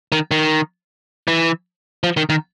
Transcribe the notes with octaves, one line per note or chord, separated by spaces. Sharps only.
D#3
D#3
E3
F3
D#3
D#3